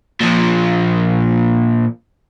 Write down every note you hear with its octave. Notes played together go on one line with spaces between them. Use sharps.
A#2 F3